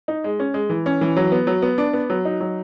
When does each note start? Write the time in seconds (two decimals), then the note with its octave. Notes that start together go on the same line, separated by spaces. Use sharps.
0.08 D#4
0.24 G#3
0.40 C#4
0.54 G#3
0.70 E3
0.86 C#4
1.01 E3
1.17 F#3
1.32 B3
1.47 F#3
1.62 B3
1.78 D4
1.93 B3
2.10 F#3
2.25 D#4
2.40 F#3